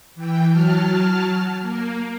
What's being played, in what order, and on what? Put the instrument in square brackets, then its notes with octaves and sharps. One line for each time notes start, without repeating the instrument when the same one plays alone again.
[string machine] E3 G5
F#3 A5 F6
A#3